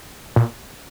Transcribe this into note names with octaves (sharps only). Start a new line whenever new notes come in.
A#2